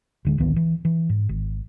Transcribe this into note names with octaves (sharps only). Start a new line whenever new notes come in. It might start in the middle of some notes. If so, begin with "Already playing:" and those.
D1 D3 G#3
D1 A#1 D#3 B3
E3
E3
G#2
G#1